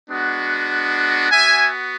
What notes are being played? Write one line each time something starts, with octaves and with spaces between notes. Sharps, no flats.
G#3 B3 D4 F#4
B3 F#4 E5 G#5